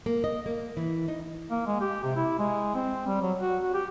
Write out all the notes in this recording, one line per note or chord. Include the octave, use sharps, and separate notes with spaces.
A#3
D#5
A#3
E3
D#4
A#3
G#3
G4
C3
E4
G#3
C4
G3
F#3
F#4
F#4
G4